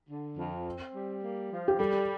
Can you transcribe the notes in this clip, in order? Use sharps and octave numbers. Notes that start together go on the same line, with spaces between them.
D3
F2
C4
G3
A#3
F3
G4
G3 A4